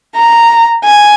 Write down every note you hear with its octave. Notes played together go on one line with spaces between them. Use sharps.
A#5
G#5